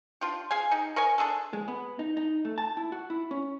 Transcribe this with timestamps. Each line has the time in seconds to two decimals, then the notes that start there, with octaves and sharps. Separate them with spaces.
0.21 D4 F4 G4
0.51 G#4 F5 G#5
0.71 D#4 G4
0.96 A#4 C#5 D#5 G#5
1.18 D4 F4 G#4 A4
1.53 G#3
1.68 B3
1.99 D#4
2.17 D#4
2.45 A3
2.58 A5
2.77 E4
2.92 F#4
3.10 E4
3.31 C#4